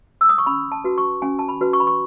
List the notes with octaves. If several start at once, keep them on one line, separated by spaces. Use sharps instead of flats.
E6
D#6
C#6
C#4 B5
A5
F#4 B4
C#6
C#4 G#5
A5
B5
F#4 B4
C#6
B5
C#6